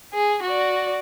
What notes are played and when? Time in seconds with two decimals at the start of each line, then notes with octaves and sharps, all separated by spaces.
0.13 G#4
0.43 F#4 D5